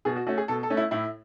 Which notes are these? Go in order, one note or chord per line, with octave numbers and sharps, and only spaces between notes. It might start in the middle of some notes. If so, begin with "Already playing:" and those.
B2 G#4
F#4
A3 C#4 F#4
G#4
B2 A4
A4
A3 C#4
E4
A2 E4